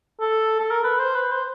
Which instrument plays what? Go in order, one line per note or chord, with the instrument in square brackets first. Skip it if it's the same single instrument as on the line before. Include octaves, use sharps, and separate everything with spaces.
[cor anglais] A4
A4
A#4
B4
C5
B4
C5